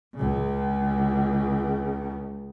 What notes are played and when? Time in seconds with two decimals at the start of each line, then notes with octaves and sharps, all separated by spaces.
0.15 C#2 C#3